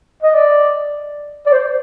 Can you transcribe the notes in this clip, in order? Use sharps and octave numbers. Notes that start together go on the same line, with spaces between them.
D#5
D5
D5
C5